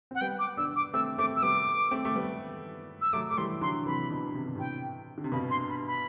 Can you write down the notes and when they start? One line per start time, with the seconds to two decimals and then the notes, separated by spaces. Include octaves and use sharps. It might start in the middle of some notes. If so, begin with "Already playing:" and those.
0.11 C4 F#5
0.21 G3 B3 G5
0.39 D6
0.57 B3 D4 E6
0.76 D6
0.93 A3 C4 E6
1.18 A3 C4 D6
1.36 E6
1.42 G3 B3 D6
1.91 A3 C4
2.05 A3
2.15 G3 B3
3.01 E6
3.13 F#3 A3 D6
3.29 A3 D6
3.38 E3 G3 C6
3.61 D3 F#3 C6
3.86 C3 E3 B5
4.10 B2 D3
4.35 C3
4.46 D3
4.55 A2 C3 G5
5.18 D3
5.24 C3
5.32 G2 B2 B5
5.50 C6
5.69 B5
5.87 B5